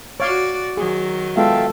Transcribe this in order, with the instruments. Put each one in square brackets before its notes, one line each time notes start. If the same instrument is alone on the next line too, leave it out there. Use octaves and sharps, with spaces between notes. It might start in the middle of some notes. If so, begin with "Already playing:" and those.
[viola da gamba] F#4 D5 [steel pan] C#5 F5
[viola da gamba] D#3 F#3 [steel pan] G#4
[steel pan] G#3 B3 F4 [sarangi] A4 [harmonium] E5 F5 G5